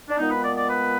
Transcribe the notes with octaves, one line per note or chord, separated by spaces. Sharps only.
D4
A#2 G#3 B3 D#4
B4
D5
D5
B4